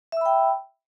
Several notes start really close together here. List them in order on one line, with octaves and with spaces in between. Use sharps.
E5 E6 B5 G5